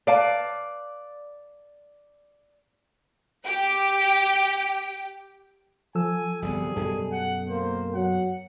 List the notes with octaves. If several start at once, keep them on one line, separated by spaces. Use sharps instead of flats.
B4 D5 F5 A5
G4 G5
F3 A4 G#5 E6
G1 C2 G3 B3 G#4
F#2 B2 A4
F#5
A#3 C5
F#3 F#5